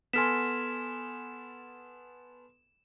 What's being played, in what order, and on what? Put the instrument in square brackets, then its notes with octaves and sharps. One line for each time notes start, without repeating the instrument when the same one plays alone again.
[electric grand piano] B3 A4 G#5 [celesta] C6 F6 B6 [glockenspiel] E7